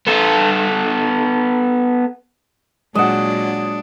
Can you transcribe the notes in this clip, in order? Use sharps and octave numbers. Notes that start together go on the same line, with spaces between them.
B3 A4
A#2 F#3 G#3 D4 D#5 F#5 E7